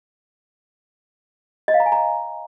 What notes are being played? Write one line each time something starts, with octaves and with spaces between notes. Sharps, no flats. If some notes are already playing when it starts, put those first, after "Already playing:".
D#5
F5
A#5
G#5
A#5